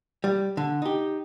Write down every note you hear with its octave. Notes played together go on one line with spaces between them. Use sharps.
G3
D3
D#4 G4